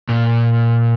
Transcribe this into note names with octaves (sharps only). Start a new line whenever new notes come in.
A#2